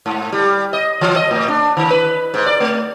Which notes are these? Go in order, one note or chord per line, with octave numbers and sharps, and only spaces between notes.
G#2
G3
D#5
E3
D#5
A2
D4
D#3
B4
G#2
D5
A3